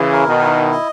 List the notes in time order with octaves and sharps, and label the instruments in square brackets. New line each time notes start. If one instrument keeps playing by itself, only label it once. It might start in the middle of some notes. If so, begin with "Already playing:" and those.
Already playing: [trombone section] C#3 E3 [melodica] E4
[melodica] A#4
[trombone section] B2 D#3
[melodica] E4
D#5